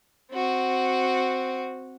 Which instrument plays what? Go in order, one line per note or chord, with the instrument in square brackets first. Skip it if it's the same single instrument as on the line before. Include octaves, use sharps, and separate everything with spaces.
[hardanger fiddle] C4 F#4